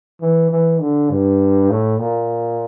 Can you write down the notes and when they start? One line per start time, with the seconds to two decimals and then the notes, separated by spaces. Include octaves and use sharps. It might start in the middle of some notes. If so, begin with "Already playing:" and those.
0.21 E3
0.51 E3
0.81 D3
1.11 G2
1.70 A2
1.99 A#2